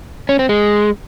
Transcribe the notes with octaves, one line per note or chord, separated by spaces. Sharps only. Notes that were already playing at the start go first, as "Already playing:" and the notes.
C#4
C4
G#3